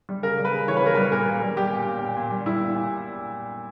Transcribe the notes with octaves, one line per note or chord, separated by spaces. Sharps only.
G3
C#3 A#4
G3
B4
C#3
E3 C#5
B4
C#3 A#4
G3 B4
A#2 A#4
A#2
G3
G3 G4
A#2
A#2
A#2
A#2
G3
G3 E4
A#2
A#2